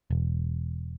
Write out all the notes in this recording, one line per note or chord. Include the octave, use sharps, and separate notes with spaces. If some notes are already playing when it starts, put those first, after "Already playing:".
E1